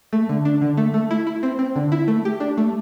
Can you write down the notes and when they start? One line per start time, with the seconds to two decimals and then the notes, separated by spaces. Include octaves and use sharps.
0.13 A3
0.29 D3
0.45 D4
0.62 D3
0.77 A3
0.94 A3
1.11 E4
1.27 E4
1.43 C4
1.59 C4
1.76 D3
1.92 E4
2.08 A3
2.25 G4
2.40 D4
2.58 A3